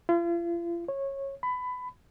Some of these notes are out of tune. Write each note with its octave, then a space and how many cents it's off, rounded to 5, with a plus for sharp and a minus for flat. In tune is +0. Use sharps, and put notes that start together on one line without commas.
F4 -40
C#5 -20
B5 +20